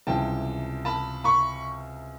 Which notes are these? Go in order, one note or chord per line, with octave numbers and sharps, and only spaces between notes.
C#2 C3 E3 G3 G5 A5
A5 B5
B5 C#6